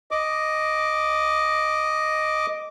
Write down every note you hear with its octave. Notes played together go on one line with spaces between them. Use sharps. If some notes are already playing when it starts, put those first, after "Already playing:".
D#5 D6